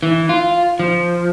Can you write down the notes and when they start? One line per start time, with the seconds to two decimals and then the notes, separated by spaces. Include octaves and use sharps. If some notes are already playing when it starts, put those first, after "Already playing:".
0.03 E3
0.29 F4
0.79 F3